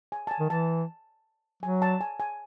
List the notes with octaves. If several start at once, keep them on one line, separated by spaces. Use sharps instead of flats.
G#5
A5
G#5
D#3
E3 A5
F#3 G#5
A5
G#5
G#5